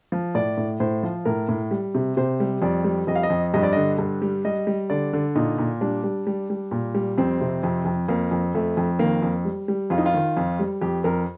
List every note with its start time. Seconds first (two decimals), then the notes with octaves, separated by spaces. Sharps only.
0.12 F3
0.35 A2 D5
0.57 A2
0.80 A2 C5
1.03 F3
1.25 A2 A#4
1.49 A2
1.71 G3
1.95 C3
2.17 C3 C5
2.40 G3
2.62 F2 D5
2.84 G3
3.07 F2 D#5
3.15 F5
3.23 D#5
3.30 F2
3.54 G2 D#5
3.63 D5
3.73 D3 D#5
3.99 G2
4.22 G3
4.45 G3 D#5
4.67 G3
4.90 D3 D5
5.13 D3
5.35 A#2 D#4
5.58 A#2
5.81 G3 D4
6.04 G3
6.27 G3
6.50 G3
6.71 A#2
6.95 G3
7.18 F2 C4
7.41 C3
7.63 F2
7.85 F2
8.08 F2 A#3
8.31 F2
8.55 F2 A3
8.77 F2
8.99 D#3 A#3
9.22 F2
9.45 G3
9.68 G3
9.90 F2 F4
9.98 D#4
10.06 F4
10.14 D#3
10.37 F2
10.59 G3
10.81 F2 G4
11.04 F2 A#4